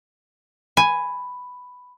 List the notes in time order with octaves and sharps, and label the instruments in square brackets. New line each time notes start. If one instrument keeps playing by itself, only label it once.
[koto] G#5 [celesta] B5